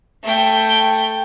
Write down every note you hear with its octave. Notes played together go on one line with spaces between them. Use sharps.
A3 G5